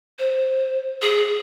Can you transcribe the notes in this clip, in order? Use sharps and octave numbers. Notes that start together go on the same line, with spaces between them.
C5
G#4